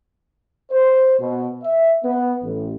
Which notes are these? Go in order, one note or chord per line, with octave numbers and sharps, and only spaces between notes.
C5
B2
E5
B3
A1